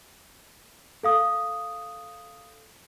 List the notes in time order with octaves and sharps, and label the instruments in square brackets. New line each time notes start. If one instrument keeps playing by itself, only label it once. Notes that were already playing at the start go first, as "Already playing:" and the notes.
[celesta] A4 F5 D#6